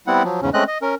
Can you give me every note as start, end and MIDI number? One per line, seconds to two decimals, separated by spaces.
0.07 0.23 55
0.07 0.23 59
0.07 0.23 60
0.07 0.23 64
0.07 0.23 78
0.24 0.40 53
0.24 0.40 54
0.42 0.50 40
0.42 0.50 44
0.42 0.50 49
0.42 0.50 61
0.54 0.64 56
0.54 0.64 57
0.54 0.64 60
0.54 0.64 61
0.54 0.64 75
0.54 0.64 90
0.67 0.78 75
0.82 0.95 61
0.82 0.95 70